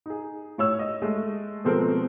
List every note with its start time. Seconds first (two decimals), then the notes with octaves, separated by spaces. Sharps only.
0.06 D#4 G#4
0.58 A2 C#5 E6
0.79 D#5
1.02 G#3 A3
1.64 B2 F3 G#3 C4 A4 A#4